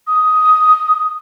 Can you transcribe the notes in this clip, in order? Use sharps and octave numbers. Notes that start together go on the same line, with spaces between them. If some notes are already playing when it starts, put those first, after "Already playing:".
D#6